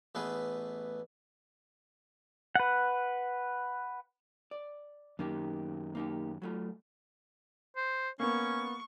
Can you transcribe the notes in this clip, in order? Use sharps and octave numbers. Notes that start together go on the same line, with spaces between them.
A1 A3 B3 G#4 B4
B4 F#5
D5
F#2 D#3 A#3 D#4 G4
A#3 D#4 G4
F#3 A3 F4
C5
A#3 B3 C#4 C#6